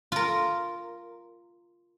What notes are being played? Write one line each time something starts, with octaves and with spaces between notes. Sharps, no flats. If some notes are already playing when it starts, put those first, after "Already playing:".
F4 A#4